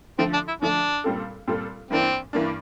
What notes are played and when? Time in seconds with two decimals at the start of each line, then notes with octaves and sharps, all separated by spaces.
0.18 D3 F3 A3 C4
0.33 D4
0.48 E4
0.61 D3 F3 A3 D4
1.04 A#2 G3 C4 F4 A4
1.48 A#2 G3 C4 F4 A4
1.90 G2 E3 A#3 C4 D4
2.33 G2 E3 A#3 D4